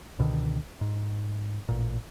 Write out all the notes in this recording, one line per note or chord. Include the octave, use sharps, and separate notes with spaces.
C#2 B2 D3 D#3
G#2
A1 A#2